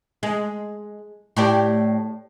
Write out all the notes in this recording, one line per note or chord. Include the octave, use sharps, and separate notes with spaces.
G#3
A2 G4 D5